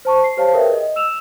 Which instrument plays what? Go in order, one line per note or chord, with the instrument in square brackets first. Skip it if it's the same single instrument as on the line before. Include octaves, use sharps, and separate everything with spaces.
[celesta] C5 A5 C#6
C7
G4 C5 C#5 F5 A5
G#4 A#4 B4 C#5 E5 G5
D#5
E6 E7 F7